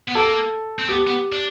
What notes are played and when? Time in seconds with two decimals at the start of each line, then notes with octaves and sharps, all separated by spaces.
0.09 B3
0.15 A#3 A4
0.79 C4
0.89 B3 G4
1.07 B3
1.32 D4